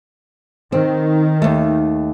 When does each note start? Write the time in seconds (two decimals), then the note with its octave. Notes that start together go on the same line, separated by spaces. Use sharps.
0.72 D#3 C4
1.42 D#2 A3